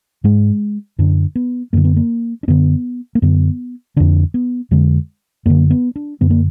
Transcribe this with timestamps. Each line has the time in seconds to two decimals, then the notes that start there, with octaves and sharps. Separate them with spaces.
0.24 G#2 G#3
0.99 F#2 D3 D4
1.35 B3
1.73 F#2 D3 A#3
1.85 B3
1.96 A#3
2.43 D4
2.48 F#2 D3 B3
3.15 A#3
3.22 F#2 D3 B3
3.96 F2 D3 D4
4.34 B3
4.71 F2 D3 G#3
5.46 F#2 D3 A#3
5.70 B3
5.96 D4
6.21 F#2 D3 B3
6.30 A#3